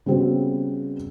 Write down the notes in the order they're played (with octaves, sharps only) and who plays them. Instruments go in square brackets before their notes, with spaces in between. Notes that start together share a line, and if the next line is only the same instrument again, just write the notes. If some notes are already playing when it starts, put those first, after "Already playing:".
[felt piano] C#3 G3 B3 C4 F#4